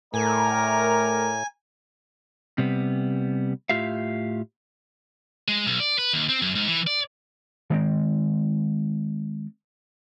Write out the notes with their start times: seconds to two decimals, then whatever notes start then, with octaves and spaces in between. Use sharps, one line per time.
0.14 A2 A3 A#4 D5 G5 G#5 A#5
2.58 C3 G3 B3
3.69 A2 F4 G4 E5 F5
5.48 G#3
5.67 B1
5.80 D5
5.98 B4
6.13 D#2
6.29 C4
6.42 F#2
6.55 G#2
6.68 E3
6.87 D5
7.70 D#3 G#3 C4